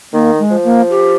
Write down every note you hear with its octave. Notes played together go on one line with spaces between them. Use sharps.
D#3 A#3
G#3
F3
A#3
G4